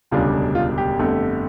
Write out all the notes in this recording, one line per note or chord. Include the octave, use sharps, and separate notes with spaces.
E1 D2 C#3 G3 D4 F4
F4
G4
G1 F2 D3 A3